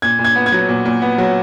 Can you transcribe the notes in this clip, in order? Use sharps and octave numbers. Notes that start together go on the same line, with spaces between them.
A#2 G#6
A#2
G#6
B3
G#6
F#3
A#2
A#2
B3
F#3